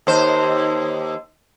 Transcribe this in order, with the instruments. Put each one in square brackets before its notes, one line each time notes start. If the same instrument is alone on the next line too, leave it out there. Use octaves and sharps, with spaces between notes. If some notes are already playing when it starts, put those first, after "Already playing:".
[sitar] D#2 C5